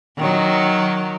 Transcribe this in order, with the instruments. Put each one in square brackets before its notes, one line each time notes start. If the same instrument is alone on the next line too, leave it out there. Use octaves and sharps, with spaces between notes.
[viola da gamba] D#3 F#3